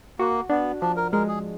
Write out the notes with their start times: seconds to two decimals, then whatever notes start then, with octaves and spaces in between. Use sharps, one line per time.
0.19 A#3 F#4
0.50 B3 D4
0.81 F3 D4
0.97 A#4
1.12 G#3 A#4
1.28 G#4